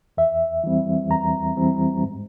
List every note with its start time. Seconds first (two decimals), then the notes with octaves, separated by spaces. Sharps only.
0.17 E2 E5
0.64 E3 G3 C4
1.10 E2 A#5
1.57 E3 G3 C4
2.03 G#2